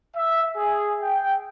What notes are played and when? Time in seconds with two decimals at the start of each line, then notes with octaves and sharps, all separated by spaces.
0.17 E5
0.57 G#4
1.02 G5